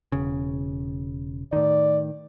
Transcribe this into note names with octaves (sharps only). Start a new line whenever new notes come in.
E1 C#3
A2 D#3 D5